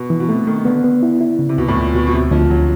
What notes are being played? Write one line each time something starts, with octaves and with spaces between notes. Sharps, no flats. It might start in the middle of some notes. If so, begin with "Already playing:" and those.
Already playing: B2
E3
B2
C3 A3
D#3 A3
D3 B3
B3
E4
E4
C#3
C3
D2 B2
A2
D2 A#2
D2 B2
B2
D2 C3
D2 F3
D2 F#3